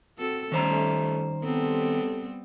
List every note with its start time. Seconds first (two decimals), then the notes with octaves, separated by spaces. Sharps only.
0.18 C4 F#4 A4
0.52 F2 D#3 G3 A3 C#4 C5 A#5
1.43 C#3 G3 B3 C4 G4 A4